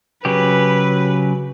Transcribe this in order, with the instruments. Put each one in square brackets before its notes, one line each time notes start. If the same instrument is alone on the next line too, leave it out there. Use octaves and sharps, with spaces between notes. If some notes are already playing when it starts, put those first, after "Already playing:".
[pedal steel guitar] C#3 F#3 G4 [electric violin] B4